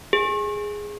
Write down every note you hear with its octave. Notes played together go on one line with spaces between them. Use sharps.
G#4